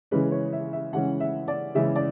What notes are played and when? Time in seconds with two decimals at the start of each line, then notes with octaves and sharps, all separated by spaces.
0.11 C#3 E3 G#3 C#4 B4
0.32 C#5
0.53 E5
0.73 E5
0.93 C#3 E3 G#3 C#4 F#5
1.20 E5
1.48 D5
1.75 C#3 E3 G#3 C#4 E5
1.96 D5